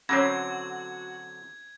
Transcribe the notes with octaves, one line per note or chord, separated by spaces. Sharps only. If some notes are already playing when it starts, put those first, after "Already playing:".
D3 F#3 C4 C#4 F#4 C#5 G#6